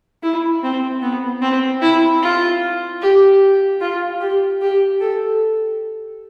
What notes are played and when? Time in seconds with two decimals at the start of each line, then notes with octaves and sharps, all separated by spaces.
0.23 E4
0.63 C4
1.02 B3
1.42 C4
1.81 E4
2.22 F4
3.01 G4
3.81 F4
4.20 G4
4.61 G4
5.00 A4